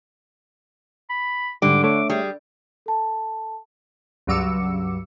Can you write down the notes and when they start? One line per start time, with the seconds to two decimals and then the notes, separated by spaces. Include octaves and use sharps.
1.10 B5
1.62 G#2 D3 G3 D6
1.84 A3 C#5 E5 D6
2.10 G3 G#4
2.86 A4 A5
4.27 C#2 G2 F#3 D6 E6 C#7